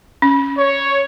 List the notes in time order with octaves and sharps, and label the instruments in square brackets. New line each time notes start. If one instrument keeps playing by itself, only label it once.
[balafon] C#4
[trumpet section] C#5